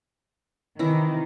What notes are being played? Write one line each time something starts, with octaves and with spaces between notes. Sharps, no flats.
C3 D#3 E3 E4 A#5